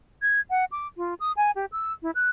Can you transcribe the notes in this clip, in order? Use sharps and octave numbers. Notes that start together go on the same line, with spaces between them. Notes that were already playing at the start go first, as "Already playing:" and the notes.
G#6
F#5
D6
F4
D#6
G#5
G4
E6
E4
F#6